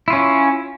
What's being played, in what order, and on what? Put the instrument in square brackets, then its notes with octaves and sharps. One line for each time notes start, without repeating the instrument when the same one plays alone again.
[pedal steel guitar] E4
F4
C#4